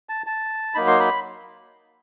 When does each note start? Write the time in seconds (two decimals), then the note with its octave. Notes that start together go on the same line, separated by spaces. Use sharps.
0.09 A5
0.27 A5
0.75 F#3 A#3 D#4 B5
0.87 C6
1.00 B5